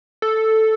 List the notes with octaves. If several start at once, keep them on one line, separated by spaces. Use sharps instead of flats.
A4